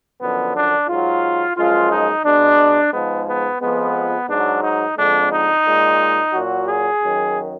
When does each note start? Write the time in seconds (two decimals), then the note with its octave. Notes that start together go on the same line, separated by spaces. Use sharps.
0.20 F#2 D3 F3 B3
0.54 D4
0.89 G#2 F#3 F4
1.56 F#2 F3 G#3 F4
1.91 D#4
2.25 B2 G#3 D4
2.93 G#2 F3 G#3 B3
3.27 B3
3.60 F2 F3 G#3 B3
4.29 G#2 F#3 D4
4.63 D#4
4.97 F2 D3 G#3 D4
5.32 D#4
5.65 A#2 G#3
6.33 A#2 F#3 F#4
6.68 G#4
7.01 F#2 D#3 F#3